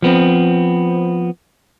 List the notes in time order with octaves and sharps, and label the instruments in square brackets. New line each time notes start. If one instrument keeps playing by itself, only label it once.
[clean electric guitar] F3 B3 C4